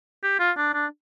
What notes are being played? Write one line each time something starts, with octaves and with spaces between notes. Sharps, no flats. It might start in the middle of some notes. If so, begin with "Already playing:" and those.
G4
F4
D4
D4